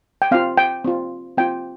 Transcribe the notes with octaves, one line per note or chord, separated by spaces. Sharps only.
G5
C4 F4 F5
G5
C4 F4
C4 F4 G5